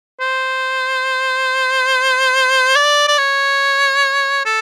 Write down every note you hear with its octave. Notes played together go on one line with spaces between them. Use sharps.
C5
D5
D5
C#5
A4